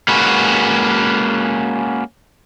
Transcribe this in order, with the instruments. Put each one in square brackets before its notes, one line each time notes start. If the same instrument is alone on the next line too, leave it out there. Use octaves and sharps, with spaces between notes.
[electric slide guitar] G#3 A#3 C#4 F#4 B4